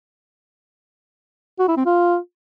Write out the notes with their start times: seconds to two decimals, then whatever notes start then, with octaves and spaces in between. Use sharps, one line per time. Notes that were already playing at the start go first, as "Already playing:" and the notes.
1.59 F#4
1.68 E4
1.77 C4
1.86 F4